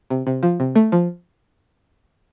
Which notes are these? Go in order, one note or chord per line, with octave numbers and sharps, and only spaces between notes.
C3
C3
F3
C3
A3
F3